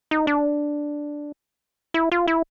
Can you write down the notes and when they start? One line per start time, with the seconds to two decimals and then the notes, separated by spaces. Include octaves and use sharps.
0.11 D#4
0.27 D4
1.94 E4
2.12 F4
2.28 E4